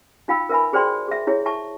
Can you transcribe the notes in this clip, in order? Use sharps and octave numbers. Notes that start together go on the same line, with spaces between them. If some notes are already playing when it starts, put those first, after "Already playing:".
D#4 F4 F5 G5 B5 E6
A#4 B4 E5 G#5 B5
F#4 G#4 C5 D5 G5 C6
G#4 E5
E4 G#4 C#5
E4 E5 A5 C#6